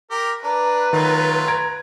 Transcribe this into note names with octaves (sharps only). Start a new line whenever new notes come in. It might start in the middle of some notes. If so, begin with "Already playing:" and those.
G4 A#4
D4 B4 A#5
D#3 F#3 A3 F4
A#5 G#6 D7